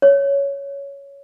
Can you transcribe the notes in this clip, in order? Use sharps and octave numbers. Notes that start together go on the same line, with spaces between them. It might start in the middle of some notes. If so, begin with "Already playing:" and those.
C#5